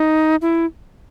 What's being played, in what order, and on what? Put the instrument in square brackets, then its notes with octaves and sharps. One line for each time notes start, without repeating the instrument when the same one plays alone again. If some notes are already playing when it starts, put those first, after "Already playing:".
Already playing: [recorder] D#4
E4